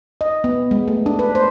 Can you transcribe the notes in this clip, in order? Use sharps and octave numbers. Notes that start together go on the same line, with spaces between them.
D#5
B3
G#3
A3
D4
B4
C5